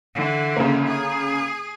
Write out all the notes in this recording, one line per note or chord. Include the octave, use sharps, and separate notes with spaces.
D3 E3
C#3 A#3
G#4